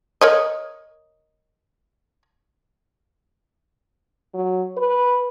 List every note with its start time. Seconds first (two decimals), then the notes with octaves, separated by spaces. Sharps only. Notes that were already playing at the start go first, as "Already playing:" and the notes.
0.21 A#4 C#5 D#5
4.34 F#3
4.77 B4